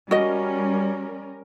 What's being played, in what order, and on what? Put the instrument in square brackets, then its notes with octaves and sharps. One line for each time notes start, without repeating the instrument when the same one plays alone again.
[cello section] G3 C#4 A#4 [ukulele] F#4 D#5